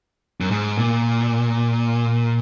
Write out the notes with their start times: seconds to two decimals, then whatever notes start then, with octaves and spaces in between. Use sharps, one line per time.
0.41 F#2
0.51 G#2
0.79 A#2